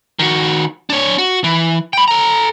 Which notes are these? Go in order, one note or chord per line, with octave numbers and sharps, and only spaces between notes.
D#3 F#4
D4 C#5
F#4
E3
G5 B5
A4 A#5